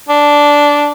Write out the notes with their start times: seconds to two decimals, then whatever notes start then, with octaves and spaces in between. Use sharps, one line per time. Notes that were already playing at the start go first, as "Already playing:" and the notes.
0.09 D4